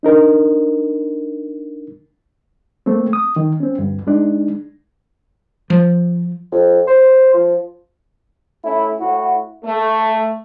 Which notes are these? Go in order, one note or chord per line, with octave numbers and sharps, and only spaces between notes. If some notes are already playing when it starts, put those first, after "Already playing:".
D4 D#4 A#4
A3 A#3 C4
D#6
D#3
C4 C#4
D2 G2
G#3 D4 D#4
F3
F2
C5
F3
A3 C#4 E4
A2 E4 F#4
A3